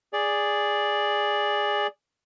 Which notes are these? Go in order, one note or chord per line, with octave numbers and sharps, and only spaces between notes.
G#4 D5